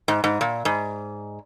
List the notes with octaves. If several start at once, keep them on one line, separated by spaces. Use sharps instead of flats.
G#2
G#2
A#2
G#2